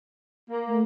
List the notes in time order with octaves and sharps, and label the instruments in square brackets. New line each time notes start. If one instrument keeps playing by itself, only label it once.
[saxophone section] A#3
[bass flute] A3